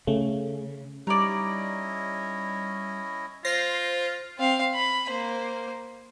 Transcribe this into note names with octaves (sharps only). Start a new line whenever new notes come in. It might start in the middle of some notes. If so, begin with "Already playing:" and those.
C#3 A3
G3 C#4 D#4 E4 D5 D#5
F4 C5 A#6 C7
C4 F5
B5
A#3 C5